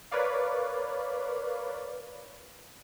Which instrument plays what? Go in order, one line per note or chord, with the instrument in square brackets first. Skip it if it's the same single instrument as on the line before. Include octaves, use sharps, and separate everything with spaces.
[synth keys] A#4 B4 C#5 D5 F5